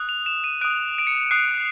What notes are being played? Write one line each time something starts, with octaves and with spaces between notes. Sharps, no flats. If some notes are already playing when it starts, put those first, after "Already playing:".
Already playing: D#6 F#6
F7
E7
D#7
D#6 F#6 D7
D7
C#7
D#6 F#6 C7